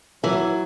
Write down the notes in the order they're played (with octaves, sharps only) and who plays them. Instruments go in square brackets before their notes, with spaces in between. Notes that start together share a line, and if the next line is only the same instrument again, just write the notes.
[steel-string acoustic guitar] E3 [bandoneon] F#3